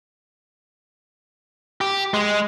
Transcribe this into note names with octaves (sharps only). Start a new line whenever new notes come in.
G4
G#3